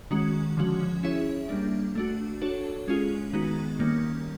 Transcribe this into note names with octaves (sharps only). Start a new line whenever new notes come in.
D#3 G#3 C#4 F#4
D3 F3 G#3 C#4 F#4
C#4 E4 G#4 C#5 E5
G3 A#3 D4
A3 D4 F#4
D4 F#4 A4 C#5
G#3 C#4 F4 G#4
D#3 G#3 B3 D#4 F#4
D#3 G3 A#3 C#4